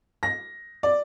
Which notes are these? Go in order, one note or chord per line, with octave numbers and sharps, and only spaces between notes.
A#6
D5